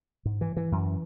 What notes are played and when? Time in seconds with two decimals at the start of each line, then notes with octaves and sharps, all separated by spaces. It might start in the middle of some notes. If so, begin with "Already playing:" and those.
0.25 G#2
0.41 E3
0.57 E3
0.72 F#2